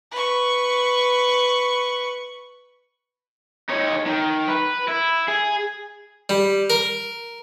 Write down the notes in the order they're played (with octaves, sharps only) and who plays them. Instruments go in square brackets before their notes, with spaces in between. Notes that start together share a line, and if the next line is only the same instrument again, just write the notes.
[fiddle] B4 C#6
[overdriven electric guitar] D#4 C#5
D#3
B4
E4
G#4
[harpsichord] G3
A#4